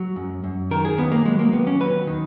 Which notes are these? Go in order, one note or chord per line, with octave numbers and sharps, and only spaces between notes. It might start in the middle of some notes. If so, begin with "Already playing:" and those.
Already playing: F#3
F#2
F#2
D#3 A#4
G#4
D#2 B3
A#3
F#3 G#3
A#3
D#2 B3
C#4
F#3 B4
D#3